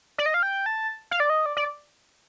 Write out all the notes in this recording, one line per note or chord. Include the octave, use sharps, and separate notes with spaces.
D5
D#5
F5
G5
A5
F5
D5
D#5
D5
D5